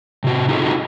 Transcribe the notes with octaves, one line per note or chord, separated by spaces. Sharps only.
C3 F#4
D#4 F4 F#4 G#4 A4 D#5